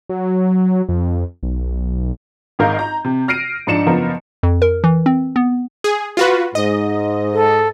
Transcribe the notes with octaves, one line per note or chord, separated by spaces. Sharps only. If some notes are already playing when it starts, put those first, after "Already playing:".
F#3
F2
B1
G#1 G#2 A#4 F5 G6
A#5
C3
F6 A#6 C7 D7 D#7
G#2 F3 D4 C#7 E7
F#1 F3 B3 A#4
F2
A#4
E3
C4
B3
G#4
F4 F#4 B4
G#2 D#5
A4